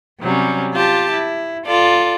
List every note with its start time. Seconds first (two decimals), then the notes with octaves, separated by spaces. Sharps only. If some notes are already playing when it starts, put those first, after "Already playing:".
0.21 C3 F#3 G3 C#4
0.73 F4 G4 A5
1.11 E4
1.66 F4 A4 D5